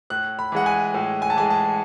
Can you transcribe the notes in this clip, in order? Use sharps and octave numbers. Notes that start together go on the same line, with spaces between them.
A2 F#6
B5
E3 G#3 F#5
G#5
A2
G#5
A5
E3 G#3 G#5
A5